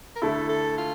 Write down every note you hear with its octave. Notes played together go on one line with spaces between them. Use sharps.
A#4
D2 D3 A3 E4 A4
A4
F4